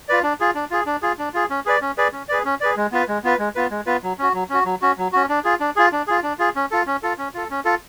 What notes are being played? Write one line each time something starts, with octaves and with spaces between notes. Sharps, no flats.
F4 B4 D5
D4
F4 G#4
D4
F4 G#4
D4
F4 G#4
D4
F4 G#4
C#4
G#4 B4 D5
C#4
G#4 B4 D5
C#4
G#4 B4 D5
C#4
G#4 B4 D5
G#3
B3 F4 B4
G#3
B3 F4 B4
G#3
B3 F4 B4
G#3
B3 F4 B4
F#3
C#4 F#4
F#3
C#4 F#4
F#3
C#4 F#4
F#3
C#4 F#4
D4
F4 G#4
D4
F4 G#4
D4
F4 G#4
D4
F4 G#4
C#4
F4 A4
C#4
F4 A4
C#4
F4 A4
C#4
F4 A4